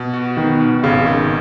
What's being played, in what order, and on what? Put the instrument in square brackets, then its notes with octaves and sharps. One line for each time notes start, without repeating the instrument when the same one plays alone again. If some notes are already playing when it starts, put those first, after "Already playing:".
Already playing: [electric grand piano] B2
F#4
[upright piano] D#3 [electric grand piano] B3
[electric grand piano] B2
[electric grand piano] G#1 [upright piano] C#3
[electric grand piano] D#3